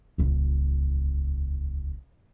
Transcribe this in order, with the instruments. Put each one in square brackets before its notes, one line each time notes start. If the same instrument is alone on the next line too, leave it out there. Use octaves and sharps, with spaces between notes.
[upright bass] D#1 C#2